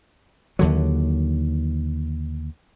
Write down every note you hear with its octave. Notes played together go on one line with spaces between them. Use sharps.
D#2 D3 F#3